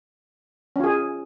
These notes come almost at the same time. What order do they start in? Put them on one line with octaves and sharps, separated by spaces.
C#4 F4 G#4